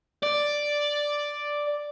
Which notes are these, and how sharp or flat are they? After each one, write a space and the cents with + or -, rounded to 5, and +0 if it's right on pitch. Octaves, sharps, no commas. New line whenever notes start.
D5 +0